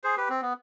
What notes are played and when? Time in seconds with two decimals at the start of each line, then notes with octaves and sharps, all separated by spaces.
0.04 G#4 C5
0.17 G4 B4
0.29 C4
0.42 B3